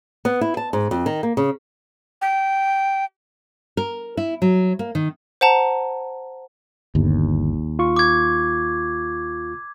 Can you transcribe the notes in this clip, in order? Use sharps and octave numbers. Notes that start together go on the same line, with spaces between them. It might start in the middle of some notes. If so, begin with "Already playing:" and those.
B3
E4
A5
G#2
F2
D#3
A#3
C#3
G5
A#4
E4
F#3
A#3
D#3
C5 F#5 A5 A#5
G1 D#2
F4 C#6
D6 G#6